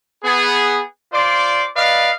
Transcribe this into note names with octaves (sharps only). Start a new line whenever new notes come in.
B3 G#4
F4 C5 D5 C6 D6
B4 D5 D#5 F5